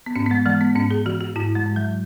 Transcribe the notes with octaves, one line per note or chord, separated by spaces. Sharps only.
B3
G#2 C#4
B3
G#3
E3 G#3
B3
G#2 C#4
G#4
E3 F#4
F#4
G#2 E4
G#3
G#2
F#3